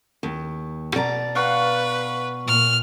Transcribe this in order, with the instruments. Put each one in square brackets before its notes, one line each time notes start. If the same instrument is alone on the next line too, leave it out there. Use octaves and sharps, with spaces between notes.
[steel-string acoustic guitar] D#2
B2 D5 A#5
[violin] B4 [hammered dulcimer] F5 F#5 C#6
[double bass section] A#2 [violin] F6